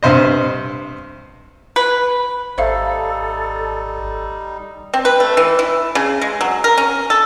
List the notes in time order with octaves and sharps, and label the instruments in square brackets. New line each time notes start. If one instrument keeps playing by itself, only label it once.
[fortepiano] G2 C3 C5 D#5
[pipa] B4
[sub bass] G#1 [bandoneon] G3 D#4 [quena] A4 [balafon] C5 E5 F5
[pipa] C4
B4
A3
E3
E4
C#3
G#3
F#3
A#4
C#4
A4